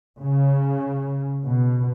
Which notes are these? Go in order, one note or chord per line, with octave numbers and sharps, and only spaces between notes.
C#3
B2